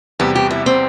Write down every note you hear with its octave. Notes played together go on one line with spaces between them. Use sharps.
E2 C3 G3 B3 G4
G4
E4
C4